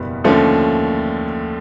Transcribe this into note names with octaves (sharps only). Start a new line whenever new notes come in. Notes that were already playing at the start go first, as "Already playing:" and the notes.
Already playing: F#1 E2 B2 G3 B3
D#2 D3 F3 A3 C#4